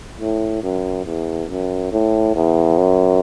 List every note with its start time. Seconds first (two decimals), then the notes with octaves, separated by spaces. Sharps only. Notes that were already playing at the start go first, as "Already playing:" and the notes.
0.21 A2
0.63 F#2
1.06 E2
1.50 F#2
1.93 A2
2.36 E2
2.78 F#2